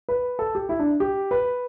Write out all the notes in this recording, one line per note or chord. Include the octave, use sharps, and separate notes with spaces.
B4
A4
G4
E4
D4
G4
B4